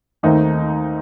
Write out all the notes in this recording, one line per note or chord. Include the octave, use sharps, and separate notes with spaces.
D#2 D#3 A3 C4 D#4